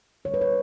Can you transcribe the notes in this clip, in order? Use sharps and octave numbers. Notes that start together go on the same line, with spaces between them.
D3 G3 C#5
B4
C#5